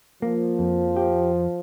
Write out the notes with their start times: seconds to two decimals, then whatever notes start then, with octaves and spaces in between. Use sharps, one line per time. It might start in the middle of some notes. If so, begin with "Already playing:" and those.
0.22 F3 A#3
0.59 F2
0.96 G4